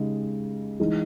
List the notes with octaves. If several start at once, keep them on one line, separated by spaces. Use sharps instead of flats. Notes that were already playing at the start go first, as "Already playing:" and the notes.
Already playing: C#3 G#3 D#4 G4
E3 G#3 D#4 G#4